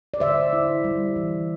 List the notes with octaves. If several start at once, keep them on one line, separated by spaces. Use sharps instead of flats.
D5
D3 C5 E5
E4
G3
E3